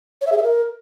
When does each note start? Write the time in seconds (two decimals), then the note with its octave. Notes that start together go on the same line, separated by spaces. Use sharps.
0.21 C#5
0.27 E5
0.32 G#4
0.37 E5
0.43 A#4